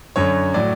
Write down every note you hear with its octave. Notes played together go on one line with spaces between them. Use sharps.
F#2 D3 F#3 C#5
A2 F#3 D5